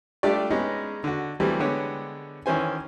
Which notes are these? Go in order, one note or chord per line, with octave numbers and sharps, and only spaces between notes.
G3 A3 D4 F4 G4 D5
G#3 B3 C#4 D#4 G#4
D3 F#4
E3 F#3 G3 A3 C4
D3 G#3 B3 G4 C#5
D#3 E3 C#4 C5 G#5